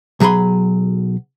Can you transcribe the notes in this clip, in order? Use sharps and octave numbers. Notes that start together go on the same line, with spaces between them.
B1 F#3 G#4 B5 C6